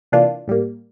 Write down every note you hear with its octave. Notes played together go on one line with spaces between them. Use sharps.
C3 E3 A#3 D4 F4
A2 G3 A#3